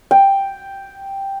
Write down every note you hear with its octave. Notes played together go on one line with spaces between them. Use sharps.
G5